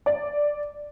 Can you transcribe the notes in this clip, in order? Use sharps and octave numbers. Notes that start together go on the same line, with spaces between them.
D5